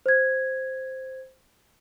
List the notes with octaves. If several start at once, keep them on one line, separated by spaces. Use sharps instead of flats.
C5 G#6